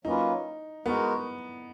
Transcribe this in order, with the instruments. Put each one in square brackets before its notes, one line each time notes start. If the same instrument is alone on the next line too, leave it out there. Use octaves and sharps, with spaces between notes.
[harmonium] F#3 A#3 C#4 F4 B4 [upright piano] D#4
[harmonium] G#3 D#4 F#4 A#4 [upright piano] B3